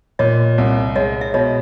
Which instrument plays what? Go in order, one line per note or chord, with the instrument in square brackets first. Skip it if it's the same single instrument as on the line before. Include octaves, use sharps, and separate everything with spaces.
[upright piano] A#2 [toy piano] C#5 D#5
[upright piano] C2
[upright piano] G#3 [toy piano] C#5 D#5
[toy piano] E5
[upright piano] B2 [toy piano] C#5 D#5